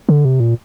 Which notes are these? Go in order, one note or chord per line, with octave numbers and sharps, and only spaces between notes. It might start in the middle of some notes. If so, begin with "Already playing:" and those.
D3
C3
A#2